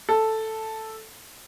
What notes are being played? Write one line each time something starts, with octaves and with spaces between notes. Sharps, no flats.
A4